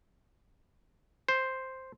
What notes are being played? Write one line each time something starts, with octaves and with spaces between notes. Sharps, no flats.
C5